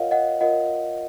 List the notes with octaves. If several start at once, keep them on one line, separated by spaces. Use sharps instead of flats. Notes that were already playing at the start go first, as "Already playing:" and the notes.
Already playing: F4 A#4 C#5 D#5 F5 F#5
D#5 F#5
F4 A#4 C#5 D#5 F#5